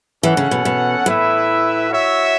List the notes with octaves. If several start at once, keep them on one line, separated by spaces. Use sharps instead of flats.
E3 C#4 A4 F#5
C#3
B2
B2
A2 E4 B4 E5
F#4 C#5 E5